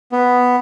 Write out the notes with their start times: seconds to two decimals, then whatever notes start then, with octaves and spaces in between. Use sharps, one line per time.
0.12 B3